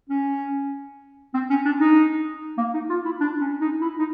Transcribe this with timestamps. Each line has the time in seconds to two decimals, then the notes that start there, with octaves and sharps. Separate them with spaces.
0.09 C#4
1.34 C4
1.50 C#4
1.65 D4
1.80 D#4
2.58 A#3
2.74 D#4
2.89 F4
3.05 E4
3.20 D4
3.41 C#4
3.61 D#4
3.81 E4
3.99 D#4